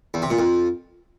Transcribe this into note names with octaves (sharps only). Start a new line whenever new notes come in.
E2
C3
A#2
F2